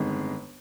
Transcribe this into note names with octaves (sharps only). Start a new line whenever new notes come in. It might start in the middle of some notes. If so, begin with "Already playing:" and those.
Already playing: G1 F2 D#3 G#3